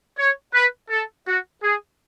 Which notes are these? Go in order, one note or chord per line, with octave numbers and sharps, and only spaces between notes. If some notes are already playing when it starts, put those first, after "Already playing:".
C#5
B4
A4
F#4
G#4